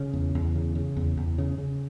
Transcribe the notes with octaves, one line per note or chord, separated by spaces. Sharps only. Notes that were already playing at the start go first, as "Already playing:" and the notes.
Already playing: C#3
E2
E2
C#3
C#3
E2
E2
C#3
C#3